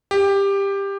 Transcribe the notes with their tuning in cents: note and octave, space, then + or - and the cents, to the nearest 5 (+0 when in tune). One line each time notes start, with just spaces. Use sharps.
G4 +15